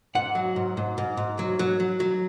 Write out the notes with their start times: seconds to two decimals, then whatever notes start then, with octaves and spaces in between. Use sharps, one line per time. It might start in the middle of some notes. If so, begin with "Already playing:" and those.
0.15 G#2 F#5
0.35 F#3
0.56 G#2
0.77 G#2
0.98 G#2
1.17 G#2
1.39 F#3
1.59 F#3
1.80 F#3
2.00 F#3